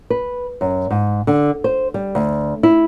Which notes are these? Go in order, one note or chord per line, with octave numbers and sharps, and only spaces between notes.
B4
F#2
G#2
D3
C5
G3
D2
E4